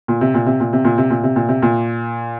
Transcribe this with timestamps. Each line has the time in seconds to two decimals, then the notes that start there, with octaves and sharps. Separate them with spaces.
0.08 A#2
0.21 C3
0.34 A#2
0.46 C3
0.60 A#2
0.73 C3
0.85 A#2
0.98 C3
1.10 A#2
1.23 C3
1.36 A#2
1.48 C3
1.62 A#2